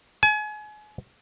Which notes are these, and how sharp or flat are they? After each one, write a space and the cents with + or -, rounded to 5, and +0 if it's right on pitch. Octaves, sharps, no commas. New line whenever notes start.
G#5 +35